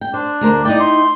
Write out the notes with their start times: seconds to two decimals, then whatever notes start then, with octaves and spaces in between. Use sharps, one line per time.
0.01 G5
0.14 D4 C5
0.41 D2 A#4 C5
0.65 D#4 E4 D5 G5
0.80 C6